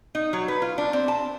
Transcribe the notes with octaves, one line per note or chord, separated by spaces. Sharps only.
D#4
F#3
B4
F4
D4
C4
A5